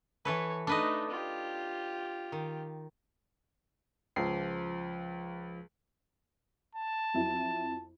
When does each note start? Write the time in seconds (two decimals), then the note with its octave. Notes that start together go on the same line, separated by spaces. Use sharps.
0.25 E3 A4 B4 C#5
0.67 A3 D4 D#4 B4 D#5
1.09 F4 G4
2.32 D#3
4.16 C#2 F3 C7
6.75 A5
7.14 F2 F#3 E4